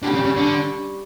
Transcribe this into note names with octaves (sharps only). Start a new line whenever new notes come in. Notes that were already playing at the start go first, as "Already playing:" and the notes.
D3 G3 C#4 G4
C#3
C#3
D3